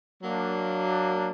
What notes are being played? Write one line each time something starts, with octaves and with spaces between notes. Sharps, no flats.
F#3 A#3 D4